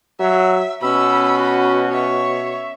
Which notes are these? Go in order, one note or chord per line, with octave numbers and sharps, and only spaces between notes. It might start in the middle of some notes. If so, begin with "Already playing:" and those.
F#3 E5
B2 C#4 B5 E6
F#4
C#5 E5